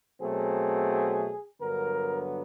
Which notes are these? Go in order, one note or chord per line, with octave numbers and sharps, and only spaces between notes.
B2 F#3 A3 C4 G#4
G2 D3 F#3 B3 A#4